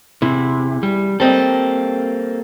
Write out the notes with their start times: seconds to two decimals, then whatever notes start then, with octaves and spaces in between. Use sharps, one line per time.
0.22 E2 C3 E4
0.83 G3
1.20 G3 A#3 C4 A4 D#5